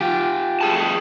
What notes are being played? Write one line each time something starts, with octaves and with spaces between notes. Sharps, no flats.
F4 G4
A3 G#4 A5